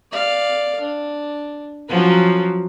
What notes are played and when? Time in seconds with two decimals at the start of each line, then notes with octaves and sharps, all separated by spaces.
0.12 D5 F5
0.81 D4
1.89 F3 F#3 C#4 B4